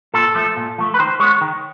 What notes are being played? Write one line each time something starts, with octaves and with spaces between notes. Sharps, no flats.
A#2 A4
F3 A3
A#2
F3 A3
B4
D#3 C5
G#3 B3 C#5
D#3